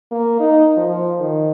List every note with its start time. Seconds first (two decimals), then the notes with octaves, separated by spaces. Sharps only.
0.12 A#3
0.40 D#4
0.77 F3
1.20 D#3